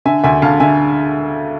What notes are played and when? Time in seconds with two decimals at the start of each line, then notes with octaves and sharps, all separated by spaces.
0.05 D3 E5 G#5
0.24 D2 E5 G#5
0.42 D2 F5 A5
0.60 D3 E5 G#5